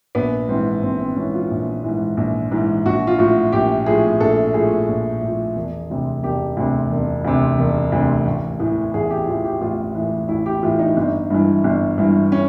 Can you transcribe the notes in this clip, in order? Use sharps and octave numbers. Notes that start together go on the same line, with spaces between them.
A#1 B3
G#2 E3 C4
A#1 C4
C4
G#2 E3 C#4
F4
A#1
G#2 E3
A#1
G#2 E3
A#1 F#4
F4
A2 F3 F#4
A#1 G4
A2 F3 G#4
A#1 A4
A2 F3 G#4
A#1
A2 F3
E1
D2 C3
E1 G4
D2 C3
E1
D2 C3
E1
D2 C3
A1
A2 E3
A1 G#4
G4
A2 E3 F4
G4
A1 F4
A2 E3
A1 E4
G4
A2 E3 F4
D#4
G1
G2 E3
G1
G2 E3
C#4